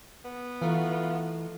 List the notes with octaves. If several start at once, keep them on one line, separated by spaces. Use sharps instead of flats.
B3
E3 A3 D#4 F4 F#4